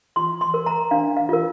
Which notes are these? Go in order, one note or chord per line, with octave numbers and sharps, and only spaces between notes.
F4 C6
C6
A#4
A#5
D4 F5
F5
F4 A#4